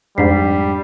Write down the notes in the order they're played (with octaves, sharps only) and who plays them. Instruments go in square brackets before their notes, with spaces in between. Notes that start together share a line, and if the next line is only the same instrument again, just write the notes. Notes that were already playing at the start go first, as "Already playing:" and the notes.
[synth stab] F2 G#2 [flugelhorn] G3 [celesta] D4 B6 C7